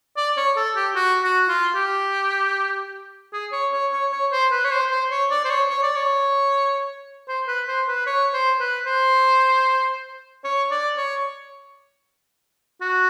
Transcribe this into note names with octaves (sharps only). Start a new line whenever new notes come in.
D5
C#5
A4
G4
F#4
F#4
F4
G4
G#4
C#5
C#5
C#5
C#5
C5
B4
C#5
C5
C5
C#5
D5
C5
C#5
C#5
D5
C#5
C5
B4
C5
B4
C#5
C5
B4
C5
C#5
D5
C#5
F#4